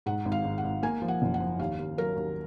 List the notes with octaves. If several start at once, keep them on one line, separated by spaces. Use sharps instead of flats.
G#2 F#5
G#1
F5
G#1
F#5
G#1
A#3 G#5
F3
F#5
F#1
F#5
F3
D#2 F5
D#2
F#3 A#4
D#2